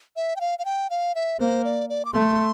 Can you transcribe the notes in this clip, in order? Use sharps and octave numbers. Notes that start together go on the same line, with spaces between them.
E5
G5
F5
F5
G5
F5
E5
A#3 C5
D5
D5
D6
A3 C6